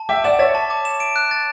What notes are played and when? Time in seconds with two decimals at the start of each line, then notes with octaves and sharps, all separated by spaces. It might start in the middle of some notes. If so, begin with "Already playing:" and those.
Already playing: A5
0.09 E5 G5 D6
0.24 D5 F#5 E7
0.39 C#5 E5 A6
0.55 A5
0.70 D6
0.85 E7
1.00 D7
1.16 F#6
1.31 A6